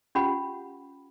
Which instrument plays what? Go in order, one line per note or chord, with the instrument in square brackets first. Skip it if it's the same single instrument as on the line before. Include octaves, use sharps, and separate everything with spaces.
[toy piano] C#4 F4 G4 F#5 B5